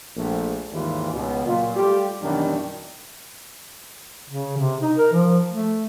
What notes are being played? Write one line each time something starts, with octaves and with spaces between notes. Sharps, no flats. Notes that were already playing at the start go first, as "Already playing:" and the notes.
A#1 A3
D#2 G#2 D#3 E3 G3 F4
C#2 B2
A#2 F#3 F4
G3 A3 F4 G4
F#2 B2 D#3 E3 G3 D4
C#3
C3
D#4
A#4
F3
A3